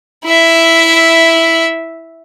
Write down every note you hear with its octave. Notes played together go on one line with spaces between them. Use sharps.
E4 E5